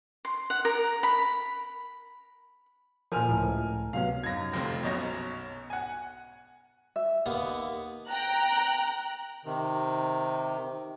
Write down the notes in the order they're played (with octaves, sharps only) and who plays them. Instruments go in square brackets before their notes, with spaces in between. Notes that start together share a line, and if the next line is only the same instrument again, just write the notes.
[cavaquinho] C6
F#5
A#4
B5
[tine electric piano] A#2 F3 [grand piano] A#4 G#5 F6
[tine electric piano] C#2 A2
[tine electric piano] C3 F#3 B3 [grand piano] F5
[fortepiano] F#2 D#4 [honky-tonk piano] G#6 A#6
[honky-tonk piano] F1 C3 [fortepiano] F3 C4
[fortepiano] B1 B2 [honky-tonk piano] F#2 C#5 A#6
[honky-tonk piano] F#5 G#5
[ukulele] E5
[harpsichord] D#2 B3 F#5 [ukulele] F5
[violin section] G5 A#5 F#6
[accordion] C3 D#3